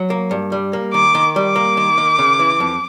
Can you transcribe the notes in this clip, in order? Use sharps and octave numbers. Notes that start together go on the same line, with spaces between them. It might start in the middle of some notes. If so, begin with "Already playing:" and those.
Already playing: F#3
A#3
G2
G3
A#3
D#3 D6
D#3
G3 D6
A#3
D#3
D#3
C#3
E3
F2